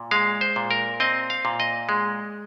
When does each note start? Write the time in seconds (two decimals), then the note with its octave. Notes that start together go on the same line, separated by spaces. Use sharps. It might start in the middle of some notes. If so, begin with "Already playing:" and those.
Already playing: A#2
0.11 G#3 F5
0.41 C5
0.56 A#2
0.71 A#4
1.00 C4 D#5
1.30 F5
1.45 A#2
1.60 D#5
1.89 G#3